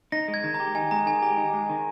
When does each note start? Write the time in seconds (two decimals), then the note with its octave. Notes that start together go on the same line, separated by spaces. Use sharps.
0.12 D#4 A#6
0.28 G#3
0.34 G#6
0.44 D#3
0.54 A#5
0.60 G4
0.75 D#4 G#5
0.91 G#3 A#5
1.06 D#3 G#5
1.22 G4 A#5
1.37 D#4
1.53 G#3
1.69 D#3